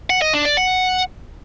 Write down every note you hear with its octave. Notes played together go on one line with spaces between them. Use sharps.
F#5
D#5
D4
D5
F#5